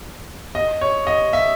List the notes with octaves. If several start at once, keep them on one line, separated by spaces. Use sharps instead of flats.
D#5
C#5
D#5
E5